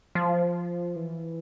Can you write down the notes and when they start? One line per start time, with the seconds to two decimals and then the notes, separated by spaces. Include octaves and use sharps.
0.15 F3
0.96 E3